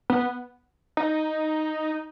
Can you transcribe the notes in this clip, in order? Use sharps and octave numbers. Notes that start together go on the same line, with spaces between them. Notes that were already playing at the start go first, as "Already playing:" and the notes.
B3
D#4